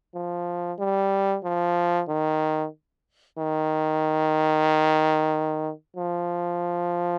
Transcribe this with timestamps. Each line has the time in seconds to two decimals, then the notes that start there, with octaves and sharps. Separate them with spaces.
0.14 F3
0.79 G3
1.44 F3
2.08 D#3
3.38 D#3
5.97 F3